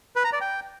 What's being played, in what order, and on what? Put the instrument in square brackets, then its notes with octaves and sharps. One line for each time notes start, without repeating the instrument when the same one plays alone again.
[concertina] B4
A#5
D5
G5